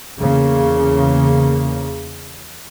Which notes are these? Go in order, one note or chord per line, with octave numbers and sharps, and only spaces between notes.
E2 C#3 A#3